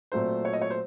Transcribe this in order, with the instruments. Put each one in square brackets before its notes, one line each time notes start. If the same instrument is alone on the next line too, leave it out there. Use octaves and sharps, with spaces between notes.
[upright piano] A#2 F#3 A3 C4 C5
C#5
D#5
C#5
C5